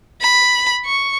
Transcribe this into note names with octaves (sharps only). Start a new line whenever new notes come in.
B5
C#6